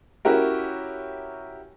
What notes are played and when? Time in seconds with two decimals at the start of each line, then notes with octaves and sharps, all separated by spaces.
0.25 C#4 E4 F#4 G4 A#4